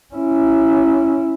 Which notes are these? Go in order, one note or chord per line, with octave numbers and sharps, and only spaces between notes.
C#4 E4